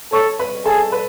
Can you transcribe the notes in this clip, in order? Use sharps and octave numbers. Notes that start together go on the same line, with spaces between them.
A4 C#5 C#6
B4 B5
G#4 A4 A5
B4 B5